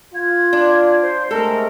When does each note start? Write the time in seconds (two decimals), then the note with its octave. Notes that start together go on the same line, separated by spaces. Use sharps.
0.15 F4 G#6
0.53 D4
1.02 C5
1.31 C3 G#3 A3 A4 A#4